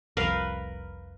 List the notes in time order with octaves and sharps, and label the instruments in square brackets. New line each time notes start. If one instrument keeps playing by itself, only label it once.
[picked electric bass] F1 C2 F2 [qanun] A#4 B4 F5